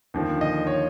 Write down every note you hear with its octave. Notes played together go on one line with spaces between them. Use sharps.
D#2 D3 F3
D#5
C#5